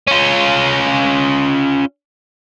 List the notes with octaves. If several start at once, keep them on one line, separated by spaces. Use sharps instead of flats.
C#4 F4